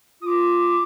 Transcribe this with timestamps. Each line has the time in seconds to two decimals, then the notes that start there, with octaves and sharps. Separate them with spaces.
0.21 F4 D6 D#6